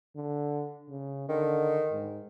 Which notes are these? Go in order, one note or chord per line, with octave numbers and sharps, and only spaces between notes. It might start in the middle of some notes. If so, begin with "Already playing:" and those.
D3
C#3
D3 D#3
G#2